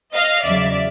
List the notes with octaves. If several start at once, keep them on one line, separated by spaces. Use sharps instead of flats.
D#5 F5
E2 C#3 F#3 D5 E5